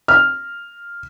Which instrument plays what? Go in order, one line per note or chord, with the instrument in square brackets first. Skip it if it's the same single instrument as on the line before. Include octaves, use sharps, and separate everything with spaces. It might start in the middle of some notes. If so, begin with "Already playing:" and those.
[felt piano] F6